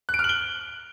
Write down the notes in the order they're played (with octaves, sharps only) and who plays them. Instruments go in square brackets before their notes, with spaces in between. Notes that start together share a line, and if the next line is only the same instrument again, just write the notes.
[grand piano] F#6
D7
F6
F#7
G7